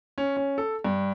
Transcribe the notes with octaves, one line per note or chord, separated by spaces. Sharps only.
C#4
C#4
A4
G2